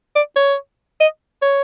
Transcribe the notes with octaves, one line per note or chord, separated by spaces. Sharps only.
D5
C#5
D#5
C#5